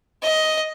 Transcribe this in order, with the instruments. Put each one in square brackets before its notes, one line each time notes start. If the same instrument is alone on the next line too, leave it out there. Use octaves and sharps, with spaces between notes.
[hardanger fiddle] D#5